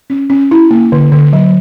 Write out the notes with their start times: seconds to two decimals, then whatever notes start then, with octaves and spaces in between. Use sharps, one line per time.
0.10 C#4
0.30 C#4
0.51 E4
0.71 A#3
0.92 D3
1.12 D3
1.33 F#3